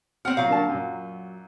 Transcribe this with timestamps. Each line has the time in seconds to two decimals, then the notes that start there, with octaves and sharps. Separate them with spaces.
0.25 C4 F#5 F6
0.37 A#2 F#3 F5
0.49 D3 A#3 A5
0.69 F#2 A#2